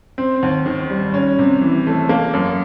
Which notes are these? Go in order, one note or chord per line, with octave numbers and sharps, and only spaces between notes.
C4
D#2
D#3
G3
C#4
C3
E3
A3
A#3
F#2